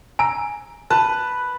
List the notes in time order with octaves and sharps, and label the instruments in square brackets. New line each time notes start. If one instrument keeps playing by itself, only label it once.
[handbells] G#5 A#5 E6 [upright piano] D7
[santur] B4 [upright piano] A5